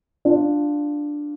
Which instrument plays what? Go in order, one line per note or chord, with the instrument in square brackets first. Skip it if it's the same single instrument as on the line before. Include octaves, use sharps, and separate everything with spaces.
[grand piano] D4 F4